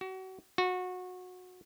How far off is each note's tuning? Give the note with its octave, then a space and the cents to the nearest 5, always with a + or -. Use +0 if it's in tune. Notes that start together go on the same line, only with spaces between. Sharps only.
F#4 +35
F#4 -20